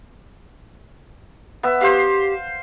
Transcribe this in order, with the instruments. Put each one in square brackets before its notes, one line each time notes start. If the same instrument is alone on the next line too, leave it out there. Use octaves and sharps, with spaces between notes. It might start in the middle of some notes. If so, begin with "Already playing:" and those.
[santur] B3 E5
[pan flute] G4 [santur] C5 F5